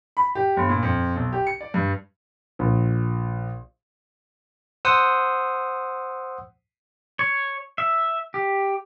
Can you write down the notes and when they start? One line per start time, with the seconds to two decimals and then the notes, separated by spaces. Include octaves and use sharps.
0.17 B5
0.35 G4
0.57 G1
0.69 A#2
0.83 F2
1.16 B1
1.33 G4
1.47 C#7
1.61 D5
1.74 G2
2.59 A#1
4.85 C5 F#5 D#6 E6
7.19 C#5
7.78 E5
8.34 G4